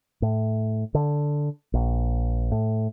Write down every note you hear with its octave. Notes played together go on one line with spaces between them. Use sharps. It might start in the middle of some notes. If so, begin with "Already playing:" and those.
A2
D3
A#1
A2